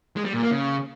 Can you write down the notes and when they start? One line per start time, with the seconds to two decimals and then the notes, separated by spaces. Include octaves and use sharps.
0.16 G#3
0.25 G3
0.34 A#2
0.42 A#3
0.51 C#3